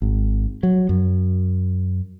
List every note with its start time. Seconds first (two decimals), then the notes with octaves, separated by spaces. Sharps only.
0.02 G#1
0.63 F#3
0.89 F#2